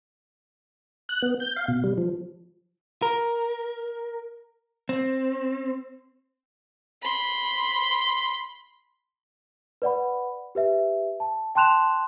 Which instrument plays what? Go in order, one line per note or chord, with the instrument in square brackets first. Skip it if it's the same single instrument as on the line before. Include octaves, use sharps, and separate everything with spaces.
[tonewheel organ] F#6
B3
G6
F5
B2
G3
F3
[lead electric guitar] A#4
C4
[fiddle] B5 C6
[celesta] B4 D5 F#5 B5
G4 B4 E5
A5
G5 A5 C6 F#6 E7 F7